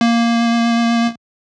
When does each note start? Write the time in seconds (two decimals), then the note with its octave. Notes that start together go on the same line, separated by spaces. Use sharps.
0.01 A#3